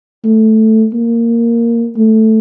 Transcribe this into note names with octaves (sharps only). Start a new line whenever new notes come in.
A3
A#3
A3